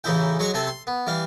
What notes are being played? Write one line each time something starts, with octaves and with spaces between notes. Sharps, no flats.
A1 C#3 E3 D#4 E4 G5
F#3 G#3 C#5 C#6 D#6
C3 A3 C4 A4 C6
C6
B3
E3 G3 F5